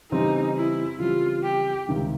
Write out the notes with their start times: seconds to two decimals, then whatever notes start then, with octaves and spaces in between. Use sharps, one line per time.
0.12 C#3 E3 G3 C4 D#4
0.56 E4
1.00 C#3 E3 G3 C4 F4
1.43 G4
1.88 C#2 C3 D#3 G3